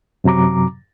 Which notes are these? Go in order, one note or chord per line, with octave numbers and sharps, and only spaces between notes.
F#2 C3 F#3 A#5 D6